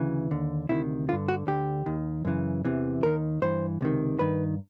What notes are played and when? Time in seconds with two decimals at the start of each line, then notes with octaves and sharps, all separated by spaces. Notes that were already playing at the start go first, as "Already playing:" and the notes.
Already playing: D2 C#3 E3
0.31 D#2 D3
0.69 D2 C3 D#3 E4
1.09 D3 F4
1.12 G2
1.28 F#4
1.47 D2 D3 G4
1.86 D#2 D#3
2.25 F#2 C#3 E3
2.65 E2 C3 E3
3.03 D#2 D#3 A#4
3.42 G2 E3 C5
3.81 C#2 C3 D#3
4.19 G2 D#3 B4